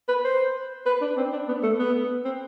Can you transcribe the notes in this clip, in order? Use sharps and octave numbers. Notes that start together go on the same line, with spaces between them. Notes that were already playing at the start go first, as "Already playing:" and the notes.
B4
C5
B4
D4
C4
D4
B3
A3
B3
C4